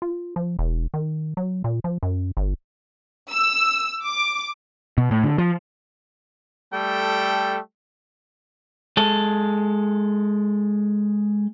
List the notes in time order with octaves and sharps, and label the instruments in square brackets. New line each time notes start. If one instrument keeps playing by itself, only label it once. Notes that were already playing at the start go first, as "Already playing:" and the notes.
[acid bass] F4
F3
E1
D#3
F#3
A#2
F3
F#2
G1
[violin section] E6
D6
[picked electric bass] B2
A2
D3
F3
[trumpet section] G3 A3 A4 G5
[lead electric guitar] G#3 A4